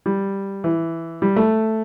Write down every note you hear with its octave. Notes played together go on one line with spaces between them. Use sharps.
G3
E3
G3
A3